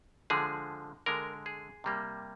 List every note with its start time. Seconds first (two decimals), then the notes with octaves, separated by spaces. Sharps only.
0.30 D3 F3 G#3 G#4
1.06 D3 G#3 A#4
1.46 G#4
1.84 C3 G3 A#3